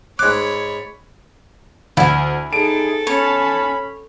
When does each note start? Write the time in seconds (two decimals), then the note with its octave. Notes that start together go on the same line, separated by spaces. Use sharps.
0.19 G#2 C#5 B5 D6 F#6
1.97 D2 E4 G#5
2.53 D#4 G#4 A4 A5 D7
3.07 C#4 C#5 B5